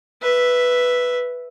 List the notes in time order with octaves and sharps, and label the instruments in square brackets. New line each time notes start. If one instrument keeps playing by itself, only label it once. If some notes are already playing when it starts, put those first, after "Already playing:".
[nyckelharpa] B4 E5